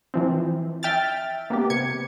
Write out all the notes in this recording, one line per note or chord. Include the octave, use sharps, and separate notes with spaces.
E3 F3 C4
E5 G5 F6 A6
A#3 B3 G4
C3 G#6 C#7